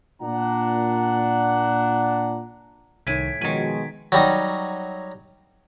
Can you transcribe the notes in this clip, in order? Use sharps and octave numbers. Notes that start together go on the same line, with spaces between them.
A#2 D4 F#5 A#5
C2 A2 D#3 G#5 G#6 B6 D7
B2 D#3 F3 G#3 F#4 C#5 G#5
F#3 G3 D#4